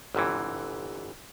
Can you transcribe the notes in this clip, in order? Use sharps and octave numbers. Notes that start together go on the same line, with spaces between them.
G1 G#2 C3 E3